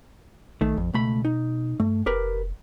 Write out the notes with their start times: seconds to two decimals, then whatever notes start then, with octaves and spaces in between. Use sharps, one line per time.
0.61 A#1 D#3 A3
0.77 A1 F2
0.94 C#2 B2 A3 B5
1.25 D#4
1.80 G2 A3
2.06 F1 G4 A#4 B4